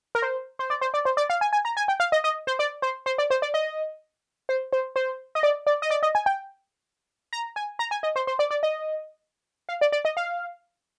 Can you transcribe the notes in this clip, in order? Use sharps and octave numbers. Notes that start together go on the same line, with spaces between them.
A#4
C5
C5
D5
C5
D5
C5
D5
F5
G#5
G#5
A#5
G#5
G5
F5
D#5
D#5
C5
D5
C5
C5
D5
C5
D5
D#5
C5
C5
C5
D#5
D5
D5
D#5
D5
D#5
G#5
G5
A#5
G#5
A#5
G#5
D#5
C5
C5
D5
D5
D#5
F5
D5
D5
D#5
F5